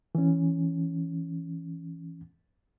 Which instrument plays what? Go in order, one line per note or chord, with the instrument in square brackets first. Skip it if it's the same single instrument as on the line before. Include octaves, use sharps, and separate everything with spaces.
[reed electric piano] E3 C#4